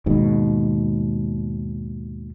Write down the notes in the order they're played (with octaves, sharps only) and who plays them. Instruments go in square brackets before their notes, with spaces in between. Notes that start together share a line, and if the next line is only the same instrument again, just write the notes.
[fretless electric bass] D#2 G#2 B2